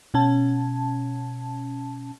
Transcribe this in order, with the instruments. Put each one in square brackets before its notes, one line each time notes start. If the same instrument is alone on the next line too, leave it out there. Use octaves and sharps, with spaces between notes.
[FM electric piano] B2 C#4 A5